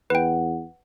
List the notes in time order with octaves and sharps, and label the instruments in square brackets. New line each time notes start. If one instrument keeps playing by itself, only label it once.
[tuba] E2 [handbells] B4 G5 [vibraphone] F#5